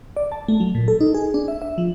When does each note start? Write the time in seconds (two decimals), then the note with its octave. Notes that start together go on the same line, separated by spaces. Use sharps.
0.17 D5
0.32 A5
0.48 A3
0.60 F#3
0.75 A#2
0.88 A4
1.01 D#4
1.14 G#4
1.34 D4
1.48 E5
1.62 E5
1.78 F3